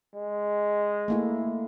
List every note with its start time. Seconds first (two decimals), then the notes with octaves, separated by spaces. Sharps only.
0.15 G#3
1.08 A3 A#3 E4